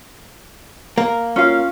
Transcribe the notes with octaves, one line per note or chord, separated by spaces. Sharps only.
A#3
C#4 F4 F5